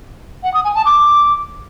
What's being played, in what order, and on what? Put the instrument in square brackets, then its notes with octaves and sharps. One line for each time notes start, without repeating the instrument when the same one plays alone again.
[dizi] F#5
D#6
G#5
A5
D6